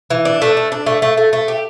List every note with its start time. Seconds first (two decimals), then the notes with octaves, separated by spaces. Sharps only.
0.10 E3
0.25 D4
0.42 A3
0.57 D4
0.72 D4
0.86 A3
1.02 A3
1.17 A3
1.33 A3
1.48 G4